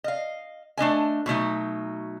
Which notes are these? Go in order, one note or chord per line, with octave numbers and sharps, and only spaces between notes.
D#5 F5
A3 D4 D#5 G#5
B2 F#3 A3 D#4